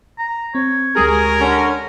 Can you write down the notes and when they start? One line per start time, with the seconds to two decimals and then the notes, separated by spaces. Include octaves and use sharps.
0.18 A#5
0.55 C4 C#5
0.96 D2 G#3 G4 G#4 A#4
1.40 D3 C#4